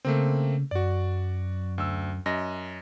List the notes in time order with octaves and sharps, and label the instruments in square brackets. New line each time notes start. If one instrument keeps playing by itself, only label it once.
[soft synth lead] C#3 [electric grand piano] A3 A#3 C4
[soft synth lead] F#2 [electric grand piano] F#4 D5
[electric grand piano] D2 E6
F#2 D#5 A#6